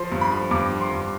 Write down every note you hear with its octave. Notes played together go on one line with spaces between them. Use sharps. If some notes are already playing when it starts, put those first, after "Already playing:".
Already playing: F3 C6
G2
B5
F3
G2 D6
F3
C6
G2